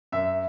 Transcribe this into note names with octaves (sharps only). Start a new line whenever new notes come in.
F#2 E5